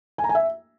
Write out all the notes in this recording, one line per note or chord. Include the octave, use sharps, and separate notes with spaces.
G#5
A#5
G#5
E5